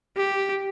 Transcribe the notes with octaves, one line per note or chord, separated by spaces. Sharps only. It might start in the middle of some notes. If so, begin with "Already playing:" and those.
G4